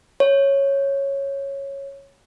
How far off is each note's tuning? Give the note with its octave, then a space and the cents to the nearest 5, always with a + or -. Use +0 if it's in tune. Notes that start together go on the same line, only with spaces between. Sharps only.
C#5 -5